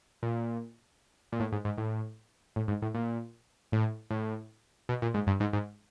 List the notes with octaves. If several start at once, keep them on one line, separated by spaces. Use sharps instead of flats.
A#2
A#2
A2
G#2
G#2
A2
A2
G#2
A2
A#2
A2
A2
B2
A#2
G#2
G2
G#2
G#2